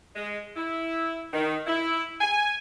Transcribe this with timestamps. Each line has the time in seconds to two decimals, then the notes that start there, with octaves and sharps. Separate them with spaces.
0.15 G#3
0.57 E4
1.34 D#3
1.67 E4
2.21 G#5